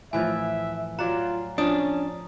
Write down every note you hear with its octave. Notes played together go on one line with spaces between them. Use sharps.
A2 E3 F3 E5 G#5
F#3 F4 D5 F#5 A#5
F3 C#4 D4 D#6